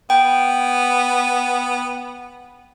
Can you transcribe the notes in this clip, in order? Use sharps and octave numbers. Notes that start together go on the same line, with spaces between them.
B3 G5